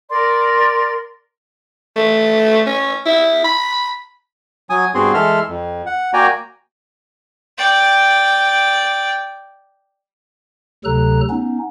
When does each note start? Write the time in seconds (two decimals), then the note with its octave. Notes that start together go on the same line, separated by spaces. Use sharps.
0.10 A#4 D5 C6
1.96 A3
2.67 C#4
3.06 E4
3.45 B5
4.70 F#3 G#5 D#6
4.94 G2 B3 C4 F#4 G#4 C6
5.14 E3 G#3 A4 E5 C6 F6
5.49 F2
5.86 F#5
6.14 A#3 F#4 D5 G5 G#5 A#5
7.58 D5 G5
10.85 D2 C3 F#3 A4 A#5 F#6
11.30 B3 C#4 D#4